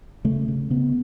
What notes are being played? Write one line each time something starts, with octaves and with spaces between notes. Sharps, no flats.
C#3 A3
C#3
C#3 B3